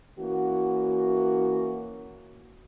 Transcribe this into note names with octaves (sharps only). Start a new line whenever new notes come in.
E3 A#3 C#4 F#4